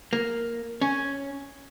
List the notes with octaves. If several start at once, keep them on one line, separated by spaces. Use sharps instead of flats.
A#3
C#4